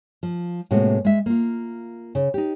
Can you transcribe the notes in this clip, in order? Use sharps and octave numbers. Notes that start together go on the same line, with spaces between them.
F3
A2 C3 G#3 A#3 B3 F#4
G#3 E5
A#3 F4
C#3
D#4 G4